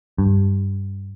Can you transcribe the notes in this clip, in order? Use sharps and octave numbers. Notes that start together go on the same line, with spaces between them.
G2